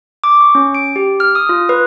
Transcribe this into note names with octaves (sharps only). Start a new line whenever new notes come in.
D6
C#6
C#4
D7
G4
F6
D#6
F4
B4